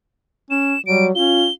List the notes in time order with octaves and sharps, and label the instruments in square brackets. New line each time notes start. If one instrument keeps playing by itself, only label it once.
[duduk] C#4 [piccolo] E7
[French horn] F#3 [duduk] G3 [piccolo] D7
[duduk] C#4 [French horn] F4 [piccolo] G7